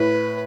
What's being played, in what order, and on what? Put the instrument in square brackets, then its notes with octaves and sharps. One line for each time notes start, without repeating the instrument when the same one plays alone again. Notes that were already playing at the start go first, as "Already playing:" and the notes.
Already playing: [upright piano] A2 [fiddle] B4